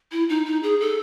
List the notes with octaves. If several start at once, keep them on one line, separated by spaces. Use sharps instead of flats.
E4
D#4
D#4
G#4
A4